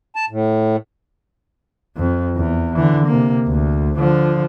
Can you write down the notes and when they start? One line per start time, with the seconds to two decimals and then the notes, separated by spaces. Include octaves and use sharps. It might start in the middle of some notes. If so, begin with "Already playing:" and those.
0.16 A5
0.30 A2
1.97 F2
2.36 E2
2.76 D3 E3
3.06 C3 A#3
3.47 D2
3.98 D3 F3